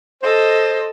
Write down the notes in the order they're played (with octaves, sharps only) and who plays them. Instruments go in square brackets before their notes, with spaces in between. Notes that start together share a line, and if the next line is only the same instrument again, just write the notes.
[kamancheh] A4 D#5 [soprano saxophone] C5